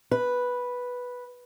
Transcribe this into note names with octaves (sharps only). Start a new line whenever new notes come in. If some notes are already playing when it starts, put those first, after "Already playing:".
B4